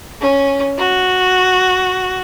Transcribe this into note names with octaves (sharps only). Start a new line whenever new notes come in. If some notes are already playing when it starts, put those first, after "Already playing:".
C#4
F#4